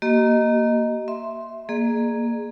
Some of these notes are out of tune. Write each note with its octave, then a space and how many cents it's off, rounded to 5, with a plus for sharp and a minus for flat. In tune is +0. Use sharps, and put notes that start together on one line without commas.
A#3 +0 G4 -40 D#5 +0
E5 +0 C6 +5
A#3 +0 G#4 +0 D5 +40